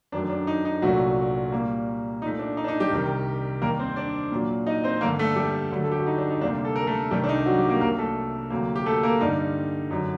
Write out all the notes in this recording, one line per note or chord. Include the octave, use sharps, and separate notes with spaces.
F#2 D#3 F#3 A3 D4
D4
D#4
D#4
C2 A#2 F#3 A3 F#4
A#2 G3 A#3
A#2 A3 D#4
D4
D#4
D4
D#4
G3 G4
C2 C3 D#3 G3
D#2 D#3 G3 A#3 A#4
C4 C5
D4 D5
A#2 F#3 A#3
D#4 D#5
C4 C5
G2 D3 A3 A#3 A#4
A3 A4
G3 G4
D2 D3 F#3 A3
A4
G4
F#4
D#4
D4
D#4
D2 C3 G3 A#3 D4
A4
A#4
A3 A4
C2 C3 D#3 G3 A3 G4
D4
D#4
F#3 F#4
G3 G4
A#3 A#4
C2 C3 F#3 A#3 A#4
A3 A4
D2 C3 F#3 A#3
G4
A3 A4
A#3 A#4
G2 D3 G3 D#4
F#2 D3 F#3 D#4